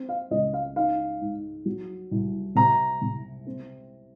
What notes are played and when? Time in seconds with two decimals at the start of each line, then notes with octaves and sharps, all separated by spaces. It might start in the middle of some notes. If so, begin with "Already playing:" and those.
Already playing: C4
0.09 F5
0.31 C#2 D#5
0.54 F5
0.76 D#4 F5
1.21 G#2
1.65 F#3
2.11 C2
2.55 C3 A#5
3.02 C3
3.46 C4